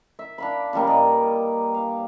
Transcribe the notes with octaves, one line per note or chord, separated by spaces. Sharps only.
E5
D4 F5 B5
C#3 F3 G3 A#3
G2 D5 D#5
F5